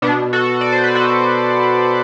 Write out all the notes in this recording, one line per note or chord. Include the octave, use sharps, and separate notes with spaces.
B2 B3 D4
F#4 A4
D5
C5
B4
F#4 A4